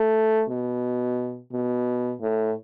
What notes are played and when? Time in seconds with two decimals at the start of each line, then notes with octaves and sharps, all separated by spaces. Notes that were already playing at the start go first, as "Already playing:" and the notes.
Already playing: A3
0.49 B2
1.52 B2
2.21 A2